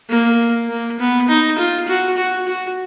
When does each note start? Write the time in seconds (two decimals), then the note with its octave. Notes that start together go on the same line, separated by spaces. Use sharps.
0.10 A#3
0.70 A#3
1.00 B3
1.29 D#4
1.58 F4
1.88 F#4
2.17 F#4
2.48 F#4